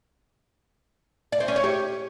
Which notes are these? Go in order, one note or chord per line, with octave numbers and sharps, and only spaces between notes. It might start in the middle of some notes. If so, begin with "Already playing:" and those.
D5
C4
C#4
C#5
G4